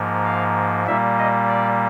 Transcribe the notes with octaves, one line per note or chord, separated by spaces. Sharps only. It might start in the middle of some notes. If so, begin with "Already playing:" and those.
Already playing: G#2 F3 A#3
F5
A#2 G3 A#3 E5
D#5
D5